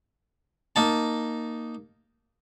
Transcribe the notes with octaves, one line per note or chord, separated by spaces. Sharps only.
A#3 D#4 A5